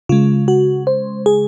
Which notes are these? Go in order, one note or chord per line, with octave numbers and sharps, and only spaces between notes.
C#3 G#3 F4
F#4
C5
G#4